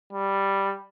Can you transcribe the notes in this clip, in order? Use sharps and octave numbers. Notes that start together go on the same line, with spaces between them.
G3